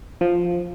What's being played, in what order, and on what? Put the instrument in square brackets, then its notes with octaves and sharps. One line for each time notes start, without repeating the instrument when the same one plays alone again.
[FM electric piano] F3